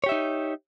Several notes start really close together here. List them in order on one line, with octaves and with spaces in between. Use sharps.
C#5 G4 E5 D#4